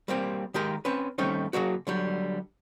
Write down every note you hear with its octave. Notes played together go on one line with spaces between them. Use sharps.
G3 A#3 C4 G4
D#3 G#3 G4 A#4
C4 C#4 B4
D#3 G3 A3 C4 C#4 D#4
C#3 F#3 A#3 F#4
D3 F#3 G3